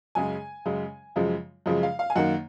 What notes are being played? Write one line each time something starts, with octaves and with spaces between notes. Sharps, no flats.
F#2 C#3 G#3 G#5
F#2 C#3 G#3
F#2 C#3 F3 G#3
F#2 C#3 F3 G#3
F5
F5
G#5
F#2 D#3 A#3 F#5